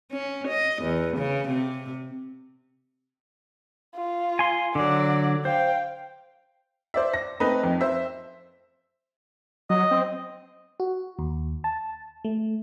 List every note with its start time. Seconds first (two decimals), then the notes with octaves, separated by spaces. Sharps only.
0.12 C#4
0.48 D#5
0.83 E2
1.18 C#3
1.49 C3
3.95 F4
4.39 G#5 C6
4.75 D3 F#3 D5 F#5
5.45 C5 F5 G5
6.94 C5 D5 E5
7.14 A#6
7.40 A3 C4 D#4 B4
7.63 F2
7.81 C5 E5
9.70 F#3 D#5
9.91 C4
10.80 F#4
11.19 D#2
11.64 A5
12.24 A3